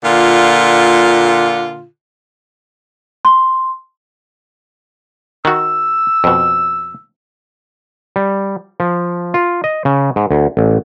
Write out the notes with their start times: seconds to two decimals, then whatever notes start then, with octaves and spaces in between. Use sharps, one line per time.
0.04 A#2 D3 F4
3.25 C6
5.45 D#3 F#4 E6
6.24 F2 B2
8.16 G3
8.80 F3
9.34 F4
9.64 D#5
9.85 C#3
10.16 G#2
10.31 D2
10.57 A1